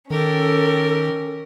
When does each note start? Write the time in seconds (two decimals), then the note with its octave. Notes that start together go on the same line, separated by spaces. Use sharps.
0.11 D#3 C#4 G4 A4 A#4